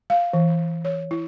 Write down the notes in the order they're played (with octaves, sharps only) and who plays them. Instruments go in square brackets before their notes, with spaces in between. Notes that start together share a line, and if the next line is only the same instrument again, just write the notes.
[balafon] F5
E3
C#5
E4